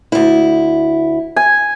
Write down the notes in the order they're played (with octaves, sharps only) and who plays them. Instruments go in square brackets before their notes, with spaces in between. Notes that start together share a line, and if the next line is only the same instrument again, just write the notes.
[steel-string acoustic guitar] D2 E4
[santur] G#5